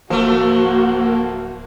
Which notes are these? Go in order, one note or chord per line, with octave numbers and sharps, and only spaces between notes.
D1 F3 A3 A#3 F#4